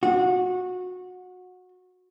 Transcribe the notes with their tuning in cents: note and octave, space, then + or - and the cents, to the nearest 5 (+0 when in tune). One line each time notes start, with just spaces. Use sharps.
F#4 -20